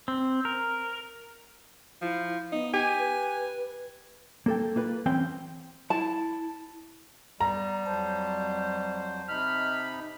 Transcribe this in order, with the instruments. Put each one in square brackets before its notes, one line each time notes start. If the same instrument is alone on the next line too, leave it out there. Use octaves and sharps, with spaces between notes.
[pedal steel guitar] C4
A#4
[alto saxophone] F3 [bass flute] E4
[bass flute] B3 [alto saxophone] D#4
[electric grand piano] G4 [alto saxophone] G#5
[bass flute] B4
[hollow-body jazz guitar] A#3 A4 G5
A#3 F4 B4
E3 C4 C#4 G5
[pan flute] E4 [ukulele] A5
[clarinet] G3 [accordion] B3 [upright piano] A#5
[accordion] F2 F#3 C5 [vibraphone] A5
[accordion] C3 D#4 B5 [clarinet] F6